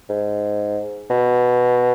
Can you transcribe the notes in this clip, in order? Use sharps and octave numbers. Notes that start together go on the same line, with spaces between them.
G#2
B2